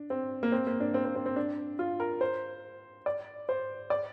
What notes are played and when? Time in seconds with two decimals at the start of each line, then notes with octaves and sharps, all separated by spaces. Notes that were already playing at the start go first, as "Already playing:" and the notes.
Already playing: D4
0.10 C4
0.43 A#3
0.52 C4
0.67 A#3
0.80 D4
0.94 C4
1.04 C4
1.15 C4
1.26 C4
1.36 D4
1.79 F4
2.00 A#4
2.21 C5
3.06 D5
3.49 C5
3.90 D5